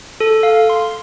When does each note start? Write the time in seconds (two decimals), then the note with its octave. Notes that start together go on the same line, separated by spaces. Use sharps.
0.20 A4
0.43 F5
0.70 C6